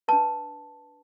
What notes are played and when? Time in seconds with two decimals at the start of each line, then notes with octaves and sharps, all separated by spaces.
0.08 D4 B4 A5